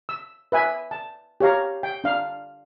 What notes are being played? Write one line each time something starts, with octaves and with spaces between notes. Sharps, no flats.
E6
B4 E5 G#5
A5
G4 C#5 F5 A#5
G5
D4 F5